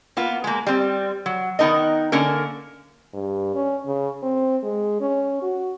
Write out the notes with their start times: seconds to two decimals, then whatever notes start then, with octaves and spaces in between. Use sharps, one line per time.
0.17 A#3 B3 F4
0.44 G#3 A#3
0.67 G3 C4
1.26 F#3
1.59 D#3 B3 D#4 A#4 D#5
2.12 D3 A#3 C#4 A#4
3.14 G2
3.55 C#4
3.87 C#3
4.23 C4
4.63 G#3
5.01 C#4
5.42 F#4